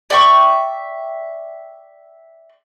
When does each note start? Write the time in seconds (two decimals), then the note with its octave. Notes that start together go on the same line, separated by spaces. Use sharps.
0.10 D5 E5 G5 C#6